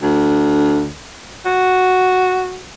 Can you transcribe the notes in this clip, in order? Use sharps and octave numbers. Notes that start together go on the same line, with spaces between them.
D2
F#4